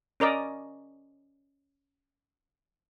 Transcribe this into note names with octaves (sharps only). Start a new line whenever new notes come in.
C#4 A#4 D5 D#5